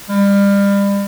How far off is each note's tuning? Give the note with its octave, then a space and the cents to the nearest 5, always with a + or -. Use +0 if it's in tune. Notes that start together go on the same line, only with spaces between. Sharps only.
G3 +35